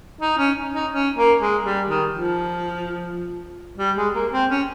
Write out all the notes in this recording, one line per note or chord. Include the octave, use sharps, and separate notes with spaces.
D#4
C#4
D#4
C#4
A#3
G#3
G3
D#3
F3
G3
G#3
A#3
C4
C#4